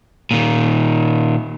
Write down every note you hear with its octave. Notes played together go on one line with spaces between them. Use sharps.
A#2 D#3